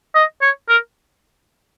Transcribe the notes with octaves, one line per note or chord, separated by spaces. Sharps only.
D#5
C#5
A#4